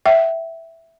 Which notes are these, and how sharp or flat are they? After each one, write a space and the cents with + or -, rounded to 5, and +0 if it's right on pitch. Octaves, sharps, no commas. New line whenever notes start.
E5 +0 G5 -45